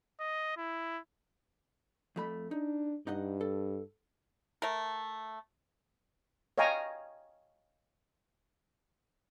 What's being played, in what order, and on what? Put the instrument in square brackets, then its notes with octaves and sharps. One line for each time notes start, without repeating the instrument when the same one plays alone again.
[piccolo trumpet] D#5
E4
[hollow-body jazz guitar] F2 A3 B5
[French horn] D4 [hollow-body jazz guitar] D#4
[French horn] G2 [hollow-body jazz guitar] D#4 D#5 F#5
[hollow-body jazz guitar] A4
[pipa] A3 A#4
[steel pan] C#5 D#5 F5 G5 G#5 A#5